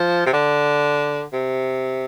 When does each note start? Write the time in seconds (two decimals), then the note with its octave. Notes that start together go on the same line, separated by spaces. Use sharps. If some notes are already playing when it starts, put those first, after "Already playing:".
Already playing: F3
0.26 C3
0.33 D3
1.33 C3